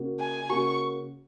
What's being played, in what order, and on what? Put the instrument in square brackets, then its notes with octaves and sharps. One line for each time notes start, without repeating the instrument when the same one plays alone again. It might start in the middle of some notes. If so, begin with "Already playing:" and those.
Already playing: [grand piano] C#3 A#3 F#4
[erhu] G#5
[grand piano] C#3 A#3 F#4 [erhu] C#6